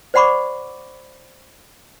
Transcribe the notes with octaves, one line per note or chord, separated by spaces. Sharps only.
C5 D5 F#5 B5 C#6 D6